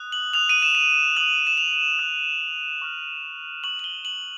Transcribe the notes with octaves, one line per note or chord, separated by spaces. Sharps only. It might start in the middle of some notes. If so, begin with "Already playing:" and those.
Already playing: D#6 F#6
F#7
D#6 F#6 F7
D#7
E7
F7
D#6 F#6 F#7
E7
F7
D#6 F#6
C#6 F6
C#6 F6 F#7
F#7
G7
F#7